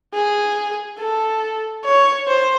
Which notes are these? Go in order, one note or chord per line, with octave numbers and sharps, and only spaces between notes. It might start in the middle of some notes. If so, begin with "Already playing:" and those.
G#4
A4
C#5
C5